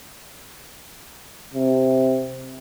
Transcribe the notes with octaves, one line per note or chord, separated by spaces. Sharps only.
C3